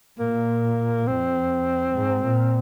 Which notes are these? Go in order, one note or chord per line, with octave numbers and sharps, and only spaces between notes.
A#2 A#3
F2 C4
G#2
A#2